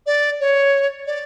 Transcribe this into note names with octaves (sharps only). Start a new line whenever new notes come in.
D5
C#5
D5